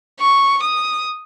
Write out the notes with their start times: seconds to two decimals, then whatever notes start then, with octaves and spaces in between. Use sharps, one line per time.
0.20 C#6
0.63 D#6